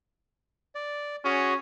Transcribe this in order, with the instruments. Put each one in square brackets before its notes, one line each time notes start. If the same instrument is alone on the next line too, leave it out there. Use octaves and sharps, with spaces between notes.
[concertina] D5
[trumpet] C#4 [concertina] F#4 G#4